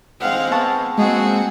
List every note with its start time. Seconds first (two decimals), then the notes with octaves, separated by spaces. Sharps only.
0.21 G#3 C4 F5 F#5
0.52 B3 F5 A5 C#6
0.98 G#3 A#3 C4 F#4 G#4